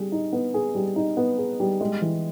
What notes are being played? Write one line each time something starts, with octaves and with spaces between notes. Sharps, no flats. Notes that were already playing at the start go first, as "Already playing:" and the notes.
Already playing: G3 G#4
D#4
B3
G#4
G3
D#4
B3
G#4
G3
G#3
E3